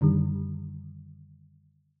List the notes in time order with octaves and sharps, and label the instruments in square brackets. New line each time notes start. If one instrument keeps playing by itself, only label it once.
[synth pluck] F#2 D3 D#3 G3